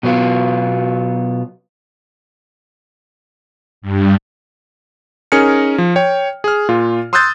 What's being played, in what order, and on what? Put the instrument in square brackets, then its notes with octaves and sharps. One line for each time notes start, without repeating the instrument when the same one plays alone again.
[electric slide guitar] B2 F#3 B3 F4
[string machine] G2
[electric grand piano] C#4 D#4 G#4 A#4 F6 C#7
F3
C#5 G5
G#4 F6
A#2 F4
C6 D#6 E6 F#6 G6 A6